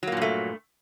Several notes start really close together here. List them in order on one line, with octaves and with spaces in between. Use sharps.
F#3 A#3 A#2 G2 A3